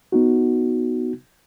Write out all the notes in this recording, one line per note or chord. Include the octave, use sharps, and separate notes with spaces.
B3 D#4 F#4